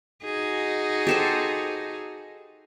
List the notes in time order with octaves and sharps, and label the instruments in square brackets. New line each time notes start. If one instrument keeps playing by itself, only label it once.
[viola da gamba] D#4 F#4 G#4
[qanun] G4 A4 C5